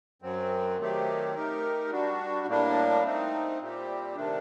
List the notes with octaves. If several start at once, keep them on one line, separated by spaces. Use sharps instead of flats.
F#2 F#3 C4
D#3 F#3 A3 C4 G4
A3 D#4 G4 A#4
G3 D4 F#4
A2 G3 A#3 D4
A3 C4 D#4
A#2 G3 C4 G4
C3 D#3 A3 D4